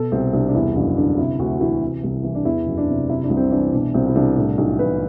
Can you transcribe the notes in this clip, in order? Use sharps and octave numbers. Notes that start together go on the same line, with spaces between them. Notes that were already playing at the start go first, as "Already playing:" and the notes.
Already playing: B2 A4
C2 C4
C2 D4
D4
E2 E4
F#1 D4
D3 D4
C3 E4
D2 F#4
E3 E4
C3
C2
E3
D4
E2 E4
F#1
D4
C3
C3 E4
D4
C2
C4
E3 D4
B2 D4
C2 C4
E4
C2 D4
A2 D4
B1 D4
E3 B4